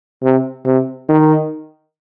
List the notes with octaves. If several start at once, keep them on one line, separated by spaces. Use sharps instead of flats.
C3
C3
D#3